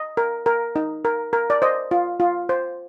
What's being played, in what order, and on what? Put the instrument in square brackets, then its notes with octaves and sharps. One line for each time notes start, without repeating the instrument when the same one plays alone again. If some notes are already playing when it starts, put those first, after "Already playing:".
Already playing: [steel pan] D#5
A#4
A#4
D#4
A#4
A#4
D5
C5 D#5
F4
F4
C5